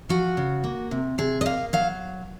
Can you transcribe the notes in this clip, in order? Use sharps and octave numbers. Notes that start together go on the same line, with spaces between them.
F3 F#4
C#3
A#3
C3
C3 G#4
D#5
A#3 F5
F#3 F5